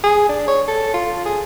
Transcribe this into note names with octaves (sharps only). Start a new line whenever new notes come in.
G#4
D4
C#5
A4
F4
G#4